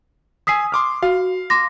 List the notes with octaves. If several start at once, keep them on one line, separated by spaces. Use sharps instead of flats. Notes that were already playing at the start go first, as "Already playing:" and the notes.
G#5 D#6 E6 B6 C7
C6 D6 F6
F#4 F5
C6 D6 A#6